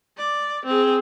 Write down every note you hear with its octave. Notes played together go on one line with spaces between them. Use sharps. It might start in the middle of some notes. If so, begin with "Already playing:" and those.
D5
C4 G#4